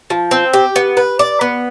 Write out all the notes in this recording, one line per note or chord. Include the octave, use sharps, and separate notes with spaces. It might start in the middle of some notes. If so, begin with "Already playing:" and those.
F3
C4
G4
B3
B4
D5
B3